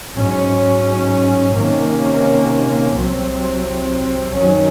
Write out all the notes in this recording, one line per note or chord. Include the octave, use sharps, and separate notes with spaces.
G#2 F#3 C#4
C3 D#3 A#3 C#4
C2 C3 F#3 C4
F#2 D#3 F#3 C#4